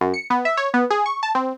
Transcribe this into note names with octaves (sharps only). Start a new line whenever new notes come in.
F#2
C#7
B3
E5
C#5
B3
G#4
C#6
A5
C4